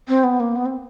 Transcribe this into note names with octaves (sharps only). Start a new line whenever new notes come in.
C4
B3
A#3
B3
C4